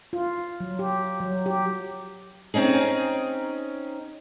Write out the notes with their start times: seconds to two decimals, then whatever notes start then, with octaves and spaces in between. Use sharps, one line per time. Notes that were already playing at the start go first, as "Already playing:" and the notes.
0.13 F4
0.60 F#3
0.79 G4
1.20 F#3
1.46 G4
2.54 C4 C#4 D#4 G#4